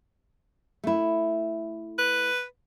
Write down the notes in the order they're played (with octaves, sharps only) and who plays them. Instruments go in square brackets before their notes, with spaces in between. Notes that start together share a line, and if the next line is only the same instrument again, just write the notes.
[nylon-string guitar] A3 E4
[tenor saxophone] B4